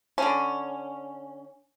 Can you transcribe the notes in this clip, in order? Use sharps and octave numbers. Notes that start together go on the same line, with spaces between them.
D3 C#4